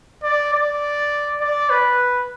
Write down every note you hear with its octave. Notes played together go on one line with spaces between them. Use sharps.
D5
D5
D5
B4